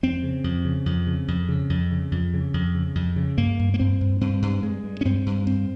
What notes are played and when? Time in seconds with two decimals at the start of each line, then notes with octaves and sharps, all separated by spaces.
0.03 F2 C4
0.23 C#3
0.44 F2
0.65 C#3
0.86 F2
1.07 C#3
1.28 F2
1.49 C#3
1.70 F2
1.91 C#3
2.11 F2
2.34 C#3
2.54 F2
2.75 C#3
2.95 F2
3.16 C#3
3.37 G2 A#3
3.59 G2
3.74 A#3
3.79 G2 C4
4.01 G2
4.21 G2 C4
4.42 G2
4.63 G2 G#3
4.84 G2
5.01 C#4
5.05 G2 C4
5.26 G2
5.47 G2 C4